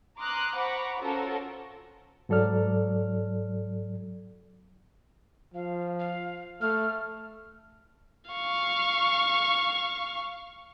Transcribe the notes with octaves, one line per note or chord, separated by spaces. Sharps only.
A#5 C6 D6 D#6 F6 F#6
C5 F#5 A#5 B5 C#6 D6
C#4 F4 F#4 A4 A#4 C5
G#2 F#3 A4 D5 F6
F3 F5
F5
A3 F6
F5 C#6